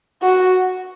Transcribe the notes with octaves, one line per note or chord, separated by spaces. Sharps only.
F#4